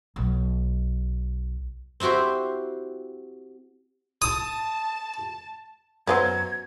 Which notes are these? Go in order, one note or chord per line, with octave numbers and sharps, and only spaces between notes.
B1
C4 E4 F#4 G4 C5
A5 D#6
F#2 F#3 A3 B3 A#4 C5 G#6